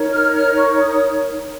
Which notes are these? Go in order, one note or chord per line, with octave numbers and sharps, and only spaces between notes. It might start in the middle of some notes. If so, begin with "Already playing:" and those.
Already playing: D#4 A#4 C#5
F6
F6
C#6
D#6